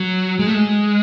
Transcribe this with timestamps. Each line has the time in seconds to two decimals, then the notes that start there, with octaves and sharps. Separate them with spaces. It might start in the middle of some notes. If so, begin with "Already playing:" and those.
Already playing: F#3
0.39 G#3
0.47 A3
0.54 G#3